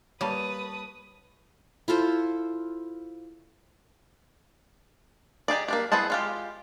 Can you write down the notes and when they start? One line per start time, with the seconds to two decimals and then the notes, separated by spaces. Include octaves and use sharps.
0.21 G3 A#3 B4 C#5 A5 D#6
1.88 E4 F4 A4 C5
5.48 D#4 G4 G#4 D5
5.68 A#3 D4 G4
5.92 B3 E4 G#4 C5 A5
6.10 G#3 F4 G4